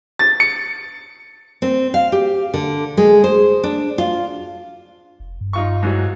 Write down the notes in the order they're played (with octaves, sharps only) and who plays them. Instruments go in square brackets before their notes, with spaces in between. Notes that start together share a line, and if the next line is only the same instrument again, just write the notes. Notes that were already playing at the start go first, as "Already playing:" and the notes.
[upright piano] A6
C#7
[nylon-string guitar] C4
F5
G4
D3
G#3
C5
D4
F4
[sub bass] F1
G2
[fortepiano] D#4 F4 C#6
G#2 E3 F#3